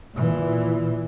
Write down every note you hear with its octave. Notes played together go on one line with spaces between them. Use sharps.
A#2 E3